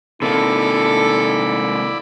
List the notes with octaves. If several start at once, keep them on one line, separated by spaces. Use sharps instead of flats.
C3 A#3 D#4 E4 A4 D5 B5